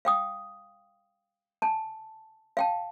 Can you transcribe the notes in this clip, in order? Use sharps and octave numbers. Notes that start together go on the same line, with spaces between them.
F5 G5 D#6
G#5 A5
F5 G5 A5